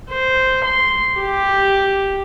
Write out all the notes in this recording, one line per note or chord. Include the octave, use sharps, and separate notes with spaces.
C5
C6
G4